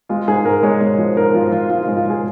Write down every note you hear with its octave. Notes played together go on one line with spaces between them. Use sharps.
G#3 F4
G#2 G#4
G#2 A#4
G#3 C#5
G#3
F3
G#2 A#4
F3 F4
F3 F4
G#2 F4
F4
G#3
F4
G#3 G#4